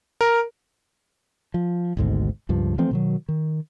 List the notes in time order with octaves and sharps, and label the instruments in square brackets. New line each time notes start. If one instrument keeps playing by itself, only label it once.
[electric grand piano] A#4
[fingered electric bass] F3
G#1 D2 G#2 B2
C#2 G2 F3
E3 F3 A3 C4
B2 D#3 F#3
D#3